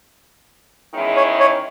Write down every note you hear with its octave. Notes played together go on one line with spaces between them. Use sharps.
E2 D#3 G#3 C#4 E4
C#5
C#5